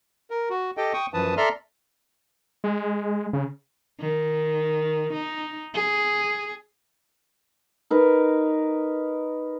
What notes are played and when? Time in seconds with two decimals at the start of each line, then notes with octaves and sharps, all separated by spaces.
0.30 A#4
0.50 F#4
0.77 G4 A4 D#5 G5
0.93 G5 C#6 D#6
1.14 F#2 E3 F3 B4 A5 D#6
1.37 A4 D5 E5 A#5 C6 F6
2.64 G#3
3.33 C#3
4.00 D#3
5.13 D#4
5.74 G#4
7.90 D#4 A#4 B4